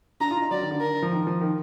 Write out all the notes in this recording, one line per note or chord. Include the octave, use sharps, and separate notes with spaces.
D4 A#5
F4
D4
D#4
F#3 D5
D#3
D3
A#4
F3
D#3
F3
D#3